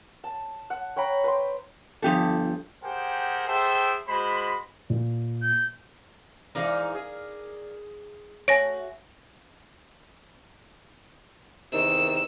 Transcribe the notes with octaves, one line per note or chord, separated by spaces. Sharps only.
A5
F#5
C#5 G5 A#5 B5
B4 G5 C6
G1 F3 G4 A4
G4 G#4 A#4 C5 F#5 G5
G#4 A4 C5 E5 G5
G#3 F#4 C5 B5
A#2
G6
G#2 E3 D#4 A#4 D5 F5
G#4
A3 F#4 C#5 G#5 A#6 D7
E2 C3 D#3 E6